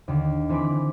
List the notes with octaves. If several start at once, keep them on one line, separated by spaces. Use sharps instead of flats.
D#2 D3
E3 C4 G#4 B5 D6